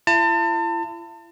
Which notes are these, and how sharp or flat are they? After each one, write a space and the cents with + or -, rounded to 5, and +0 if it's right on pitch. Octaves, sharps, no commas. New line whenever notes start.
E4 +40 A5 +35